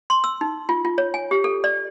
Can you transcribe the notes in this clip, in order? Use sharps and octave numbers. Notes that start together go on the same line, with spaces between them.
C6
E6
D#4
F4
F4
C#5
G#5
G4
A4
D5